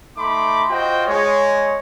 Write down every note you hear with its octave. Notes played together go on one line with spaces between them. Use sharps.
A3 D#4 B5 C6 D6
F4 F#4 C5 D#5 G5
G#3 C#5